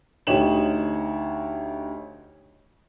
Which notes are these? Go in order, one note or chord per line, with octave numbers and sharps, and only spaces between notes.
D2 D#4 G4 C#5 E7 F#7